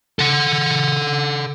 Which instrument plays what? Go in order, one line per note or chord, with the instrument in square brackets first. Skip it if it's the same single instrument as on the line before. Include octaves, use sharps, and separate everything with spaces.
[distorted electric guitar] A4 F#5